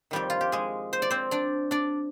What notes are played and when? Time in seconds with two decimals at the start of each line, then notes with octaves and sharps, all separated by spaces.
0.11 F2 D#3 G3 G4
0.30 F4
0.41 G4
0.52 G#3 G#4
0.93 C5
1.02 D5
1.10 C4 C5
1.31 D4 D5
1.71 D4 D5